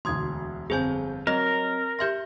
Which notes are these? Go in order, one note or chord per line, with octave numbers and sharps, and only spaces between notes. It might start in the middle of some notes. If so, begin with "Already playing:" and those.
E1 D2 C6 D#6 G#6
G1 F2 G#4 C5 G#5 G6
F#3 C4 A#4 D#5
G4 E5 C6 G6 A#6